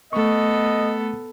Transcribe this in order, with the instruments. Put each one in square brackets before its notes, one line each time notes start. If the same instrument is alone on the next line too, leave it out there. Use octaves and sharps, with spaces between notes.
[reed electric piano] A3 C#6 [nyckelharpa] B3 A4 [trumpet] D#5